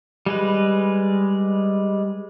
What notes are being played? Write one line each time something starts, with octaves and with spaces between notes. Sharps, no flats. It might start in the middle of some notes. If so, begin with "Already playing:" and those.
G3 G#3 B4